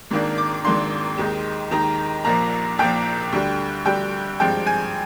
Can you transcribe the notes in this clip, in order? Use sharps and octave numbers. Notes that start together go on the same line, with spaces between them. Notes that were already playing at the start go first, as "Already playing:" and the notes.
G#1 G#2 D#3 A#3 D4
D6
G#1 G#2 D#3 A#3 D4 C6
D#2 D#3 G#3 D#4
D#2 D#3 G#3 D#4 A#5
A#1 A#2 F3 A#3 A#5
A#1 A#2 F3 A#3 G5
D2 D3 G3
D2 D3 G3 G5
G#1 G2 F3 G#3 C4 G5
G#5